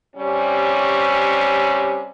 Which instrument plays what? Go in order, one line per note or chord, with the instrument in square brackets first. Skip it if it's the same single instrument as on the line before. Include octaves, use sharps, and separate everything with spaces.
[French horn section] C3 G3 C#4